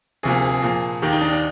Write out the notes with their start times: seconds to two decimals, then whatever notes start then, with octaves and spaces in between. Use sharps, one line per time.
0.23 D2 C3 F3 A#3 G#4
0.42 G#4
0.62 A#2 F3 A#3
1.02 D#2 D#3 A#3 G4
1.13 D#4
1.21 D4
1.32 D4